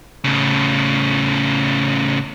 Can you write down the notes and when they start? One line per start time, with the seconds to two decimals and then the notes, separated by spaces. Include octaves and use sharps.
0.24 A2 C#3